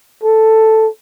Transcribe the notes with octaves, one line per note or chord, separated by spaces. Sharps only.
A4